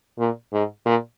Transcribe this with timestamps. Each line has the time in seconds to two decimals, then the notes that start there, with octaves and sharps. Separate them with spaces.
0.19 A#2
0.53 G#2
0.86 A#2